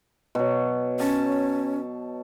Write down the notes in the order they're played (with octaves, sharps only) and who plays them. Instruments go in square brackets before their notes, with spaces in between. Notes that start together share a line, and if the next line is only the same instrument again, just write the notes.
[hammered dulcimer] B2 F#3
[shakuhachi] C#4 [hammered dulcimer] A5